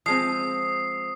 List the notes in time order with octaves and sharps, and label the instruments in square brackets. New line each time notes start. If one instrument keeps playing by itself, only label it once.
[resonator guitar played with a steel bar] F3 G#3 C4 [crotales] D#6 C7